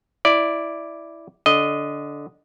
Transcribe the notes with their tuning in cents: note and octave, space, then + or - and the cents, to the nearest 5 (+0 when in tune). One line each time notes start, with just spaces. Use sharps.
E4 +0 D5 +0
D3 -15 D#5 +0